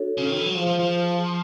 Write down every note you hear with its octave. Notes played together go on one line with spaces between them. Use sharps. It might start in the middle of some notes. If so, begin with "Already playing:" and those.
Already playing: D4 F#4 A4 C#5
C#3
D#3
E3
F#3
F3 F4 G#4 C5 F5
F3
F3